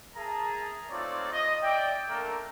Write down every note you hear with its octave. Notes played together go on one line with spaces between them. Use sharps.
G#4 A#4 E5 A5 A#5
A3 C4 D#4 F4 C#5 D5
D#5
D5 E5 G5
A3 A#3 D4 A4 A#4